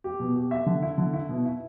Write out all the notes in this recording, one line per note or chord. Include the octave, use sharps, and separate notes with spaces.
G4
B2
G4
E5
D3
E4
D3
E4
B2
E4